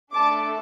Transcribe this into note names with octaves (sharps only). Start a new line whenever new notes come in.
A3 D4 A4 A5 D6